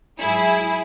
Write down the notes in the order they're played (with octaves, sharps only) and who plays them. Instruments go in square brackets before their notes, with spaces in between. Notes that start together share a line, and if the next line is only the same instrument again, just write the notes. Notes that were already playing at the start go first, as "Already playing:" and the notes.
[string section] G#2 F#3 E4 G#4